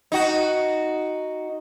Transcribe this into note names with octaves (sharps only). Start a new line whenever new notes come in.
D#4 F#4